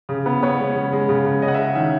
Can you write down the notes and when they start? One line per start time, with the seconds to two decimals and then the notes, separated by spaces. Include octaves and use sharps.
0.09 C#3
0.26 B3
0.43 B3 C#5
0.59 G#3
0.76 C#3
0.93 G#3
1.09 C#3
1.25 C#3
1.42 C#4 D#5
1.48 F#5
1.54 E5
1.59 C#4
1.64 F#5
1.75 D#3 E5